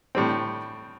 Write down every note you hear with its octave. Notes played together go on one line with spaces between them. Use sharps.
A2 G3 C4